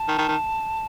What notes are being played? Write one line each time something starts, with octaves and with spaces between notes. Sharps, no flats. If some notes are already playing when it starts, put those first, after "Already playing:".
Already playing: A5
D#3
D#3
D#3